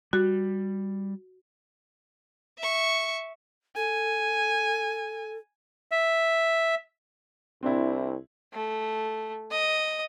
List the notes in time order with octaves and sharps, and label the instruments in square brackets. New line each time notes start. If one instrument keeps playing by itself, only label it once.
[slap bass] G3 [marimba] F#4
[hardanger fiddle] E5 C#6
[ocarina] A4 [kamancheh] G#5
[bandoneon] E5
[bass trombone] C2 [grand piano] C4 D4 E4
[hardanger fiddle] A3
D#5